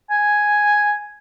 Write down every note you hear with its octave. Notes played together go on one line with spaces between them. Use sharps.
G#5